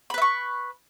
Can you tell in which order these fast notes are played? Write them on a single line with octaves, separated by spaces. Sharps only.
B5 B4 E5 C#6